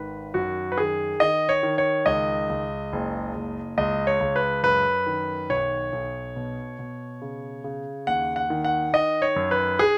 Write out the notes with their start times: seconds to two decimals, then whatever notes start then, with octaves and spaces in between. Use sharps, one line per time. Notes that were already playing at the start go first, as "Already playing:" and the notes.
Already playing: G#1 D#3 B4
0.34 F#2 F#4
0.72 B4
0.78 D#3 G#4
1.20 D#3 D#5
1.49 C#5
1.63 D#3
1.78 C#5
2.06 C#2 D#5
2.50 C#2
2.93 F#1
3.35 F#1
3.78 C#2 D#5
4.07 C#5
4.21 C#2
4.36 B4
4.63 F#2 B4
5.06 D#3
5.50 B1 C#5
5.92 B1
6.36 B2
6.79 B2
7.22 C#3
7.64 C#3
8.07 D#2 F#5
8.36 F#5
8.50 D#3
8.64 F#5
8.93 D#3 D#5
9.22 C#5
9.36 F#2
9.51 B4
9.79 G#4